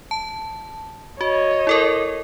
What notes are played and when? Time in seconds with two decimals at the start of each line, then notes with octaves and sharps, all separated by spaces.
0.11 A5
1.21 F#4 C#5 D#5
1.67 E4 A4 A#4